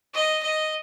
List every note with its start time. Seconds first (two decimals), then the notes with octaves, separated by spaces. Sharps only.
0.14 D#5
0.43 D#5